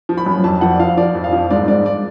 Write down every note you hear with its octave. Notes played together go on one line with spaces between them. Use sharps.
F3
B5
F#2
F2 A5
F3 F#5
D5
F3 F5
F3 D5
F2
F5
F3
G#2 D5
G#2 D5
D5